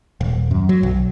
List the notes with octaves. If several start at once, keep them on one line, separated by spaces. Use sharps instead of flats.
D#1
F#2
F#3
B1